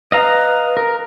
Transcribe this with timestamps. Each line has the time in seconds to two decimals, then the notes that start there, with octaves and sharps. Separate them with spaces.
0.12 B4 D#5 F5 A#5
0.77 A#4